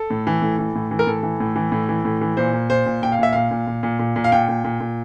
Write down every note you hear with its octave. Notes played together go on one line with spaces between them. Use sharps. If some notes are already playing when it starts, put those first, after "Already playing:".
Already playing: A4
A2
E3
A2
E3
A2
E3
A#4
A2 A4
E3
A2
E3
A2
E3
A2
E3
A#2 C5
A#2
A#2 C5
A#2
A#2 G5
F5
A#2 E5
A#2 F5
A#2
A#2
A#2
A#2
A#2
F5
A#2 G5
A#2
A#2
A#2